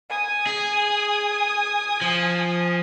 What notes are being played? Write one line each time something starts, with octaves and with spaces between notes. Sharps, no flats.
G#5 D#6
G#4
F3